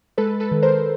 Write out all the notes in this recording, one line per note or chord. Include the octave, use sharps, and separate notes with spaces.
G#3 A4 B4
A4 B4
D#3
A#4 C5